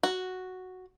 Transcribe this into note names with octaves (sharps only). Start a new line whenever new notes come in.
F#4